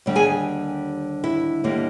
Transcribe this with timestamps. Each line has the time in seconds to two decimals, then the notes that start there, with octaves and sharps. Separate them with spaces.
0.06 D#2 D3 G3
0.15 G#4 G#5
1.24 E4 E5
1.64 D#2 D3 G3 A#3